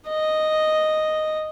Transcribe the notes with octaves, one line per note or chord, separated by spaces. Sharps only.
D#5